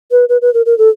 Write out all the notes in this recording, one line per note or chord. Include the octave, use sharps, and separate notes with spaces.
B4
B4
B4
A#4
A#4
A4